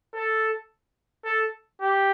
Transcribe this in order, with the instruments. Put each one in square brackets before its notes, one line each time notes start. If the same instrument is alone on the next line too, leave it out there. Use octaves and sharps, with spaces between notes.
[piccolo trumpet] A4
A4
G4